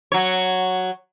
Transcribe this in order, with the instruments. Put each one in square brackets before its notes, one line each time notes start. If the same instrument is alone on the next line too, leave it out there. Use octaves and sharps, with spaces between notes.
[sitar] F#3 C#5